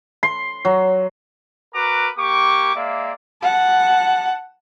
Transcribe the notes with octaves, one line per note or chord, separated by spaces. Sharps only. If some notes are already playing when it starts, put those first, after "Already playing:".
C6
F#3
F#4 A#4 B4 A#5 D6
A#3 G4 C#6 D6
G#3 A#3 D5 E5 F5
F#5 A5